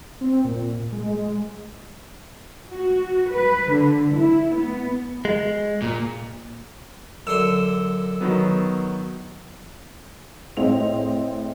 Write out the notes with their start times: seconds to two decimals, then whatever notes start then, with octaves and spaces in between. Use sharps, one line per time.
0.21 C4
0.45 A#2
0.92 G#3
1.11 G#3
2.72 F#4
3.32 B4
3.70 D3
4.17 E4
4.54 B3
5.25 G#3
5.82 A#2
7.27 F#2 D3 C6 E6
8.21 D#3 F#3 B3
10.57 A2 C4 G#4 D#5 F7